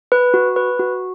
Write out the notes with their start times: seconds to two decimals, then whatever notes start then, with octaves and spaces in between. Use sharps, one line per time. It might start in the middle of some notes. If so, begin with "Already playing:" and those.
0.12 B4
0.34 F#4
0.56 B4
0.79 F#4